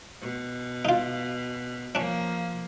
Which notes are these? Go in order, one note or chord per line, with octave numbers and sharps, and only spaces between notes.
B2
D#4 F4
F3 A#3 C#4 D4